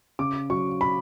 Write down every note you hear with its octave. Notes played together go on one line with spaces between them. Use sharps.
C#3 D6
F#3 C#6
B5